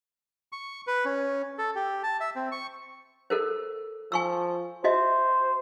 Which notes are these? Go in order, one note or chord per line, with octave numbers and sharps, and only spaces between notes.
C#6
B4
C#4
A4
G4
A5
E5
C4
C#6
A4 A#4 C5
F3 G#5 C#6 E6
F#4 C5 D#5 E5